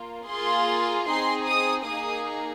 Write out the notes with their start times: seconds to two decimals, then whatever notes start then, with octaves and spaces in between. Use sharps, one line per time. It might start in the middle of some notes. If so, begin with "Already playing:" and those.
Already playing: A#3 F4
0.28 A#3 F4 G#4 C6
1.07 C4 D#4 G#4 C6
1.47 D#6
1.86 A#3 D#4 G#4 D#6